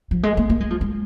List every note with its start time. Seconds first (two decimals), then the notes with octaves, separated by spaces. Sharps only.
0.11 F3
0.23 G#3
0.37 A#3
0.50 A#3
0.60 G#3
0.70 F3
0.81 G#3